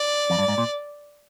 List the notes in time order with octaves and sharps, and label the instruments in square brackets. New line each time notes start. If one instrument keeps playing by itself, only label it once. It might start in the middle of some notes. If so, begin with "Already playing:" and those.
Already playing: [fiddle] D5
[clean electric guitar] F2
G2
G#2
A#2